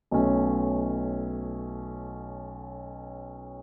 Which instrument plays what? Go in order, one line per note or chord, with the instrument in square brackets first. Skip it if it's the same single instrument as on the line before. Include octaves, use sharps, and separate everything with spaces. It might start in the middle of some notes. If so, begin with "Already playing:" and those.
[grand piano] B1 B2 A3 C#4